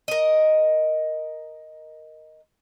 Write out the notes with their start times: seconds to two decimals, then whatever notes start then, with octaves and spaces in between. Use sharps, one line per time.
0.08 A#4 D#5